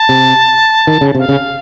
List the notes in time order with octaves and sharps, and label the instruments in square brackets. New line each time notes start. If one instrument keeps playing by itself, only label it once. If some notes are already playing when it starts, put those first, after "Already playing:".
Already playing: [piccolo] A5
[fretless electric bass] C3
D#3
C#3
[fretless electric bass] C3 [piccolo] F5
[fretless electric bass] C#3